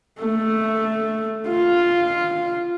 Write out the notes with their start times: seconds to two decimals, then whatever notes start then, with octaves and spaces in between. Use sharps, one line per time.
0.21 A3
1.48 F4